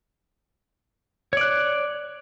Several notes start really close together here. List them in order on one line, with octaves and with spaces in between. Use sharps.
C#5 D5 F#6